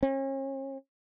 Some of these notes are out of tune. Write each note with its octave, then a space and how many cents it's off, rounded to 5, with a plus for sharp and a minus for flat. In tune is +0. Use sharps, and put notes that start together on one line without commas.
C#4 -40